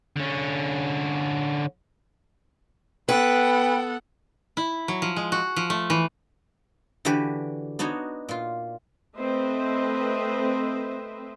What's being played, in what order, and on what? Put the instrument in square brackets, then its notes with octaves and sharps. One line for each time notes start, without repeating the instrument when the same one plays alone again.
[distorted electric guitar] D3 C#4
[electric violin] B3 A4 [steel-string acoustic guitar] B4 [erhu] F#5 [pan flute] G5
[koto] E4
F#3
F3
G#3
F#4
F3
A3
E3
[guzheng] D3 E3 D4 F#4 G4 B4
B3 D4 D#4 F#4 C#5
A#2 F4
[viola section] A3 C4 B4 C5 D#5 E5